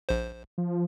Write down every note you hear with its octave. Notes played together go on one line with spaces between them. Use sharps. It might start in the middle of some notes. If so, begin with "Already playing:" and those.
A#1 C5
F3